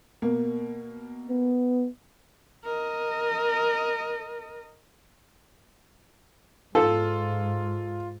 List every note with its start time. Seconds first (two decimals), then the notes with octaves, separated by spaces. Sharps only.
0.22 B2 A#3
1.29 B3
2.64 A#4 D#5
6.75 G#2 F4 A4